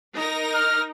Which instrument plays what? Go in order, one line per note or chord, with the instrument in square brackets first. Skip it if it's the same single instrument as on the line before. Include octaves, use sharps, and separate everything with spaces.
[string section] D#4 A#4 A#6
[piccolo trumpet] F6